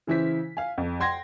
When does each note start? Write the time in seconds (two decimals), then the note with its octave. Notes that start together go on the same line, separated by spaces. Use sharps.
0.07 C#3 E3 E4 C5 B6
0.57 F5 G#5
0.78 F2
1.00 F#5 G5 C6 G#6 A#6